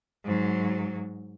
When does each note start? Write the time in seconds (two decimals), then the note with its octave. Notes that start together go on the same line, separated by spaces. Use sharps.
0.25 G#2 F#3